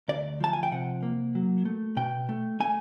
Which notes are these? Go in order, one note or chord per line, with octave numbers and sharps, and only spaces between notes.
D2 D5
F3 A5
G#5
G5
C3 F#5
A#3
F#3
A3
B2 G5
A3
A3 G#5